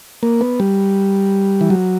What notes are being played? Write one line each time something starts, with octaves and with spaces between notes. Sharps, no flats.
A#3
B3
G3
E3
F#3